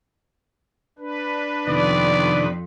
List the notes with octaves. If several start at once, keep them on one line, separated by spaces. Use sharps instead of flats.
D4 B4
F2 C3 D#3 B3 D5